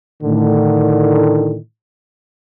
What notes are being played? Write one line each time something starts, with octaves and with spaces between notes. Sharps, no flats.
A2 D3 D#3